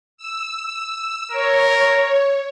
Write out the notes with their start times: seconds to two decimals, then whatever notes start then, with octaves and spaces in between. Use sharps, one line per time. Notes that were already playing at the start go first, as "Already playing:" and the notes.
0.17 E6
1.32 A#4 C#5